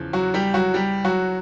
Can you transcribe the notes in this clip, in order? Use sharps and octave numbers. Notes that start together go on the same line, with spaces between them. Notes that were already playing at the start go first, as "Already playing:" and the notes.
Already playing: E2 C#3 F3
F#3 F#4
G3 G4
F#3 F#4
G3 G4
F#3 F#4